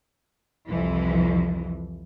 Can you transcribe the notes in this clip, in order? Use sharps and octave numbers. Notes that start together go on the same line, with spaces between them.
C2 F2 E3